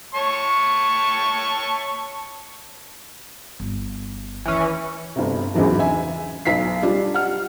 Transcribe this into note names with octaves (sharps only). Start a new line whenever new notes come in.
C#5 A5 C#6
G1
D#2 D#3 E3 C#4
G1 C3
A#1 E2 G#2 C#3 E3 F#3
E5 G#5
B1 B6 C7
G3 D4 F4
F#5 F6